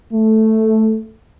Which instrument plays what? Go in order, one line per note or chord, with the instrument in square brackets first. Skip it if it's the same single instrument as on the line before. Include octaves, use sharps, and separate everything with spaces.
[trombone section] A3